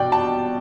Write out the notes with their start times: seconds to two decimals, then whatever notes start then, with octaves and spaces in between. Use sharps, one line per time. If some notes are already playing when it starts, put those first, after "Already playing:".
Already playing: B2 D5 G5
0.12 A5